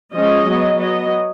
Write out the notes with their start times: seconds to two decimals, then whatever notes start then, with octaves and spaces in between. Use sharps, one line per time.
0.13 F3 G#3 C#4 D#5
0.45 F#3
0.50 B3
0.78 F#3 B3 D#5